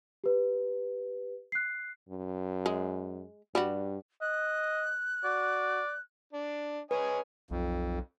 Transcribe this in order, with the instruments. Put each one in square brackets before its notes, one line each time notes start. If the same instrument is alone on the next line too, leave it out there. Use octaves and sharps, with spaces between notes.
[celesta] G4 B4
F#6 C7
[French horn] F#2
[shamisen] G#3
[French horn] G2 [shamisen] G3 F#4
[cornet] D#5 [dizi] F#6
[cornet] F#4 [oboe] D5
[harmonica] D4
[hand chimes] B4 [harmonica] C#5 D#5 G#5
[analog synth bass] B1 [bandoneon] F2